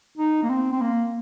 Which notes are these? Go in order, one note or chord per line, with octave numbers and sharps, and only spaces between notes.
D#4
A#3
C4
C4
A#3